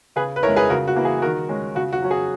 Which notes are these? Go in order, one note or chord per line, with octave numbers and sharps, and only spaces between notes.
C#3 G#4 B4
B4
G#3 C#4 E4 A#4 C#5
G#4 B4
C#3 F#4 A#4
F#4
E3 A#3 E4
G#4
D#3 F#4 A#4
G#3 C#4
C#3 F#4
F#4
F#3 C#4
G#4